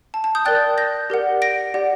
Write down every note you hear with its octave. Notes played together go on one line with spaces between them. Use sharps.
A5
A5
D#6 G6
A#4 D5 G5 F#6 A6
G6 A#6
G4 A#4 D5 F#5
A#6 D7
G4 D5 F#5